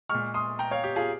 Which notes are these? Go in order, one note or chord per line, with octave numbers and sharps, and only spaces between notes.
A#2 G#3 C#6 F6
C6 D#6
G5 A#5
C#5 F5
G4
F4 G#4